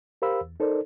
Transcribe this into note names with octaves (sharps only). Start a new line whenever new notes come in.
G4 A#4 C5 F5 B5 E6
E2
D#4 A4 A#4 C5 D5